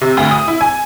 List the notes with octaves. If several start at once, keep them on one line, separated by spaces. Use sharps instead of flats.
C3
D2
D#6
E4
G#5